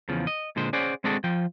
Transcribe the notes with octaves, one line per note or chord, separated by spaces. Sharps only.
E2 C#3 F3
D#5
A#2 D3 G#3 C5
C#4 G#4 C5 D5 F#5
G#3 C4 D4 F#4 G#4 A4
F3 G5